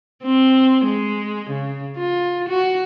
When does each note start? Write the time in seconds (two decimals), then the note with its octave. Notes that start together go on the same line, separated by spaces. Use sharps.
0.23 C4
0.85 G#3
1.50 C#3
1.97 F4
2.49 F#4